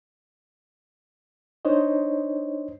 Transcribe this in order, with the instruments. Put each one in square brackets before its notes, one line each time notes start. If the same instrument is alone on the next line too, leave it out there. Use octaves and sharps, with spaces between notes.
[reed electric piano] D4 D#4 C5 C#5 D#5